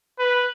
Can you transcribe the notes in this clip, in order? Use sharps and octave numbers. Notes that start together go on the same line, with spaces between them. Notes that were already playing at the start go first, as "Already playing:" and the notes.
B4